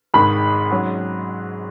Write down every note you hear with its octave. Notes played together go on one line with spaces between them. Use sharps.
G#1 G#2 D#3 G#3 B5
G#2 F#3 C#4